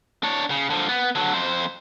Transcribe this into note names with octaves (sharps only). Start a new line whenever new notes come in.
D4 C#5
C#3
D3 F3
B3
D3 F#3
F2 C5